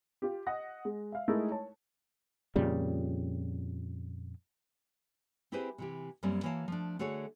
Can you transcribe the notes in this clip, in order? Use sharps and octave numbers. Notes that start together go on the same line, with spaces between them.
F4 G4
D#5 F#5 D#6 A#6
G#3
E5 F5
G#3 A3 D#4 E4 A4 A#4
C#5 A5
F2 A#2 C#3 G3
C4 E4 G4 G#4 B4 C5
C3 E3 G4
F#2 G3 A#3 C4 C#4
E3 A#3 F#4 C#5 F5 A5
F3 A3 D4
D3 A3 F#4 G#4 A4 C#5